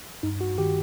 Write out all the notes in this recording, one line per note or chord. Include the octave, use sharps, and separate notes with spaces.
G2 D#4
F#4
D#3 G4